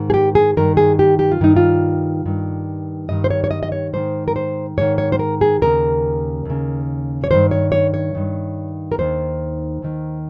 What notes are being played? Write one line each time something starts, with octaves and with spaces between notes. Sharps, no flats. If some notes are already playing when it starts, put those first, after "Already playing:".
Already playing: G#2 D#3
G#4
G4
G#4
G2 D#3 A#4
G#4
G4
G4
F4
G2 D#3 D#4
F4
G2 D#3
G2 D#3 D#5
C5
C#5
C#5
D#5
D#5
C#5
G#2 D#3 C5
A#4
C5
G#2 D#3 C#5
C#5
C5
A#4
G#4
D#2 C#3 A#4
D#2 C#3
C#5
G2 D#3 C5
C#5
C#5
C#5
G2 D#3
A#4
D#2 D#3 C5
D#2 D#3